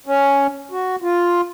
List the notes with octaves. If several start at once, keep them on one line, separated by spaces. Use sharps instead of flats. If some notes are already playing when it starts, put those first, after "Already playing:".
C#4
F#4
F4